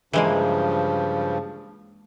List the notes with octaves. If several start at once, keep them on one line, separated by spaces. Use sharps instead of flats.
G2 C#3 E3 F3 G#3 A#3